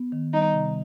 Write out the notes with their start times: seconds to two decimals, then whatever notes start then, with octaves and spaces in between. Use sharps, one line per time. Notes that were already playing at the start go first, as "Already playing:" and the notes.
Already playing: B3
0.12 D#3
0.33 G3 D#4
0.53 C3